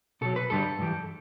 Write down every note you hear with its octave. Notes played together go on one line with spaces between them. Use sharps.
B2 F#3 A4
B4
G2 D3 G3 A4
G2 E3 G3